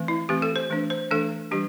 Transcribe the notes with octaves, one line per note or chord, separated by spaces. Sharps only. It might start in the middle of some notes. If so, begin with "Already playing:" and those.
Already playing: E3 A3 C4
E4
E3 A3 C4 G4
A4
C5
E3 A3 D4
C5
E3 A3 D4 A4
E3 G3 D4 G4